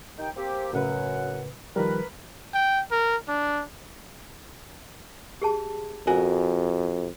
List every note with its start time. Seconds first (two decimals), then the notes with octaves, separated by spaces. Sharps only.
0.18 D#2 D#4 G5
0.36 A#3 C4 G4
0.73 F#2 A2 C#3 B4 F#5
1.76 D#3 F3 G3 A#4 B4
2.54 G5
2.91 A#4
3.28 D4
5.41 G4 G#4 A5
6.07 F2 F#4 A#4 D#5 G#5